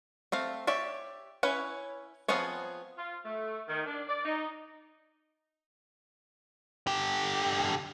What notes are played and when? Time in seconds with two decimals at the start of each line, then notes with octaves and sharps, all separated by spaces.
0.32 A3 C4 F5
0.67 G4 C#5 D5 E5
1.43 C#4 E4 B4 C#5
2.28 F3 B3 C4 G#4 C#5
2.97 F4
3.24 A3
3.67 D#3
3.86 D4
4.08 D5
4.24 D#4
6.87 D3 G4